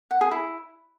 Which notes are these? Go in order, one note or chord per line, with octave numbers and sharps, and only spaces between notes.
F#5
G#4
E4